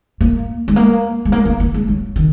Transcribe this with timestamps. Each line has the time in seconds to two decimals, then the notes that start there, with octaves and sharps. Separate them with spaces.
0.21 A#3
0.68 G#3
0.76 A#3
1.25 G#3
1.32 A#3
1.45 A#3
1.60 A#3
1.74 G#3
1.88 F#3
2.16 D#3